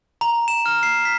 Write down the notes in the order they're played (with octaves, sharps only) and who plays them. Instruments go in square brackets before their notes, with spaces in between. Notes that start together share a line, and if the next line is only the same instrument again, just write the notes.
[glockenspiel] A#5
E7
F6
C7
B6